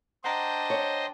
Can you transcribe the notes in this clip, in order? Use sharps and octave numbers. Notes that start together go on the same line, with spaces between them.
D4 C5 D#5 F#5 G5 A#5
C#5